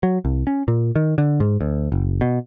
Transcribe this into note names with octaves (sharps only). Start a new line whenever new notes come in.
F#3
C2
C#4
A#2
D#3
D3
G#2
D2
F#1
B2